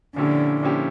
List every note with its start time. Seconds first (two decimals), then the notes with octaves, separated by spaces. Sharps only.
0.16 A#2 D3 F3 C#4 E4 G4
0.63 A#2 F3 C#4 E4 G4